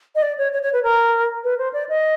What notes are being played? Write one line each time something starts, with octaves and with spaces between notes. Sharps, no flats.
D#5
D5
C#5
C#5
C#5
B4
A#4
B4
C5
D5
D#5